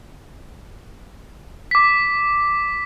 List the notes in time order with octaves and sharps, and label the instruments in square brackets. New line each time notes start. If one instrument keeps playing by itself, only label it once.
[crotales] D6 B6